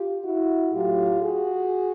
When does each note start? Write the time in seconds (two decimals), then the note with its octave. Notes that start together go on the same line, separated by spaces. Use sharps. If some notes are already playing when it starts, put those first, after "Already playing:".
Already playing: F4 G4
0.24 E4 F#4
0.72 A2 F#3 F4 G4
1.21 F#4 G#4